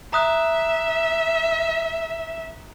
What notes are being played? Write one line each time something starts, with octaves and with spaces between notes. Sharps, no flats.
E5 A#5 D#6 F#6